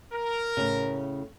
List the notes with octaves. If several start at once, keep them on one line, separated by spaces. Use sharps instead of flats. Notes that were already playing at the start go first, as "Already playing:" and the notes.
A#4
A2 C#3